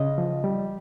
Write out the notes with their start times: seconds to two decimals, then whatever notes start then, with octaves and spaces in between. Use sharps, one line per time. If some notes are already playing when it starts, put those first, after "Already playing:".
Already playing: C#3 D#5
0.18 F3
0.44 G3